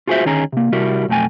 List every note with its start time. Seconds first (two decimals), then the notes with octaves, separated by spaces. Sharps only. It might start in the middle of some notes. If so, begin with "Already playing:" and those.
0.07 F4 F#4 G#4 B4 C5 E5
0.25 D2 D#3 C#4 G#4 A#5
0.53 C3 A#3
0.72 C3 G3 E4 F#4 A#4
1.08 B1 F2 A3 G5 G#5